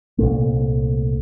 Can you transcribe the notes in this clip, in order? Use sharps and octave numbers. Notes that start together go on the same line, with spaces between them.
C2 A#2 A3